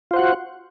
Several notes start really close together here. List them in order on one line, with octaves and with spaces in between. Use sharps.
F4 C5 F#5 F#4